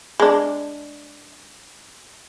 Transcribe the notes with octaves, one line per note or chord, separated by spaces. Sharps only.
G#3 D4